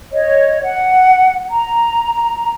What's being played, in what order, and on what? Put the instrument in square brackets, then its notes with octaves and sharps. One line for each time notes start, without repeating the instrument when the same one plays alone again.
[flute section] C#5 D#5
F#5
A#5